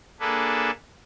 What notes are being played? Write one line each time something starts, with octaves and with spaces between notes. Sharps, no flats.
A#3 D4 G#4 A4 B4